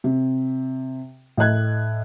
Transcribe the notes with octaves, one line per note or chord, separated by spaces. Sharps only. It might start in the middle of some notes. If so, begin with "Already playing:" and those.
C3
A2 D#5 F#6 G#6